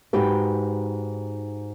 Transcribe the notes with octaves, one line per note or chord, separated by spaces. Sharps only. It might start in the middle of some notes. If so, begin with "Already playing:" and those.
G#2 D#4 F#4 G4 B4